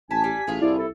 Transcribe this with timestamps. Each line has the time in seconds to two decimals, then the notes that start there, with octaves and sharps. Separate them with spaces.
0.11 A1 G#5 A5 B6
0.24 G3
0.47 A1 A2 F4 G#4
0.61 C2 E4 D5
0.78 A4